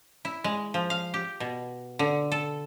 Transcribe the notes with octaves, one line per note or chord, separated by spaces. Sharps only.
E4
G#3
F3
F5
G4
B2
D3
A4